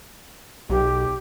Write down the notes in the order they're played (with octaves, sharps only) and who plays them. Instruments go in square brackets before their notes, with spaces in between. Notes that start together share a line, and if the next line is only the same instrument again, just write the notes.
[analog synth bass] B1 [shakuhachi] G4